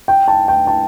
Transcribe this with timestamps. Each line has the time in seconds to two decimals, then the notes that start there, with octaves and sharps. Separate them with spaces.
0.08 G5
0.28 A5
0.48 G5
0.67 A5